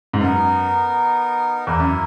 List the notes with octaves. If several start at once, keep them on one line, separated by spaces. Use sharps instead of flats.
G#2
F#2 B3 D#4 A#4
E2 A#3 E4 A#4
F#2